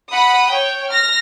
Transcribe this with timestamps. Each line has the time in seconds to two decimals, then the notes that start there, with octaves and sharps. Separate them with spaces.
0.11 F#5 B5 D#6
0.48 C#5 G5
0.88 F6 A#6